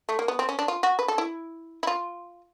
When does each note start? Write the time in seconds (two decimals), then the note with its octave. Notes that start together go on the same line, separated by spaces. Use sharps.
0.09 A3
0.19 A#3
0.28 B3
0.39 C4
0.49 C#4
0.59 D4
0.68 F4
0.83 F#4
0.99 B4
1.08 A4
1.18 E4
1.83 E4
1.87 F4